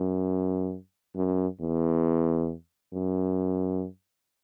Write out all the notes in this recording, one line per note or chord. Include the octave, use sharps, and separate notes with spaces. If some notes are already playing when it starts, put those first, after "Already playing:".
Already playing: F#2
F#2
E2
F#2